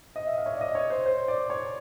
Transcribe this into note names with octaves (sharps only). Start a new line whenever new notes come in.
D#5
E5
F5
C#5
D5
D#5
C#5
C5
C5
D5
C#5